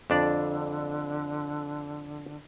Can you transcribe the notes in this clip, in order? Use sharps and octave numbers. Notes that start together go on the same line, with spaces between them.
F2 D3 D4 D5